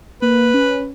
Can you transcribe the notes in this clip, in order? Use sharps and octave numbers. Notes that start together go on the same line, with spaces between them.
A#3 B4
C#4